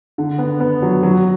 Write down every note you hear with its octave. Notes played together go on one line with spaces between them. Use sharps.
D3
B3
B3
F#3
F#3